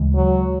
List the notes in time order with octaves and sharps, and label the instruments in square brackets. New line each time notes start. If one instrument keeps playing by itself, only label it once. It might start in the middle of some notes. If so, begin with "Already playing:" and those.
Already playing: [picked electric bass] D2 C#3 E3 G#3
[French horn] F#3